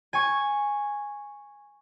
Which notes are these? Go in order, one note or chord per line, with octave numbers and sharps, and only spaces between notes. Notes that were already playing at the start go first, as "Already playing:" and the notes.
G#5 C#6